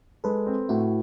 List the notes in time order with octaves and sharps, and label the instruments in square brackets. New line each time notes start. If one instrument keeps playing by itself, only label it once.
[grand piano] G#3 [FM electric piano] A4 B4
[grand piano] C4
[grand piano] A2 [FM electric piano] E4 F#4